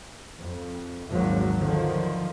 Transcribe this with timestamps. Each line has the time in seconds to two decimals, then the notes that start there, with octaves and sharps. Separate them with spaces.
0.39 F2
1.10 G#1 D#2 F3 F#3
1.61 D3 D#3 F3 F#3